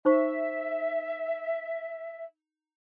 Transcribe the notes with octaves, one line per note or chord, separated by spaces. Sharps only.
D#4 C5 E5 C#6